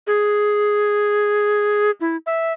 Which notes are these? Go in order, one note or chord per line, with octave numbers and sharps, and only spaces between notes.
G#4
E4
E5